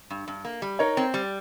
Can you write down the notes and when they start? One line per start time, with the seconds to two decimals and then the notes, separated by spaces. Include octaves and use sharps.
0.10 G2
0.28 G2
0.45 A#3
0.62 G3
0.79 D#4 A#4 C#5
0.97 C4
1.14 G3